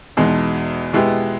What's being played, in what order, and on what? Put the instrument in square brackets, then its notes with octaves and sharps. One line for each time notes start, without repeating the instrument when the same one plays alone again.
[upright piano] E2 B2 G#3 D#4
B2 G#3 B3 E4 G4